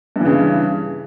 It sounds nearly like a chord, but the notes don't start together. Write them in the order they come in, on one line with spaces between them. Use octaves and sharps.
G2 E3 C#3